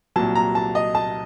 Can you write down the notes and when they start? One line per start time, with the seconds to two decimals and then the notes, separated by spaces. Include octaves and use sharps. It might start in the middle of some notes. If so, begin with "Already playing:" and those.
0.16 C2 A#2 F#3 A5
0.35 A#5
0.55 A5
0.75 D#5
0.95 A5